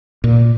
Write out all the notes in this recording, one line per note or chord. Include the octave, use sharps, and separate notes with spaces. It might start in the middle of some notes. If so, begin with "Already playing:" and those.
A#2